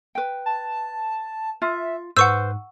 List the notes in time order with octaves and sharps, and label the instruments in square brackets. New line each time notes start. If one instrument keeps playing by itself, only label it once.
[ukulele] B4 G5
[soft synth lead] A5
[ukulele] F4 [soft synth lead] E5
[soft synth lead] G#2 [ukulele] B4 C5 [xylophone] F#5 C#6 E6